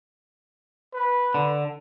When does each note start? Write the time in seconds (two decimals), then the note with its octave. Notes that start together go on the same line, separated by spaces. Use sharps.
0.93 B4
1.34 D3